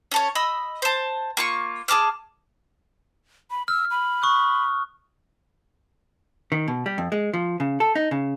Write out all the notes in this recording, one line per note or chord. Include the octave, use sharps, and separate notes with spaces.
C#4 A4 C#5
D#5 B5 E6
C5 A5
A#3 F4 C#6
G#4 A5 D6 F6
B5
E6 F6
B5
C#6 D#6 F#6
D#3
B2
G3
F2
G#3
F3
C#3
A4
D#4
C#3